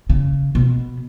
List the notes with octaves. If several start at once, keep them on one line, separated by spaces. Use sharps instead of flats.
C#3
B2